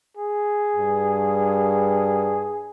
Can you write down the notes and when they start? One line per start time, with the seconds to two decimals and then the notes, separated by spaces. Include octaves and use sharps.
0.17 G#4
0.76 G2